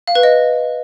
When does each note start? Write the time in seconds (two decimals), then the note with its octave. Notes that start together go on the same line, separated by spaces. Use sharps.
0.08 F5
0.15 B4
0.23 D#5